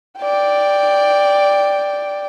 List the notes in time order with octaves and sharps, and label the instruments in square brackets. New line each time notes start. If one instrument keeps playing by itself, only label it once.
[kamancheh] D5 G5